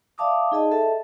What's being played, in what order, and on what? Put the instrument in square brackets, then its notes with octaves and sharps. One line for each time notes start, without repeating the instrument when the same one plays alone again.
[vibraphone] D5 E5 F5 A5 D6 D#6
D#4 G#4 D#5 A5
A4 E5 A5